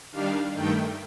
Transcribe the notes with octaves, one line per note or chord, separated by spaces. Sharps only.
D#3 G3 D4 F5
G2 D#3 A3 G5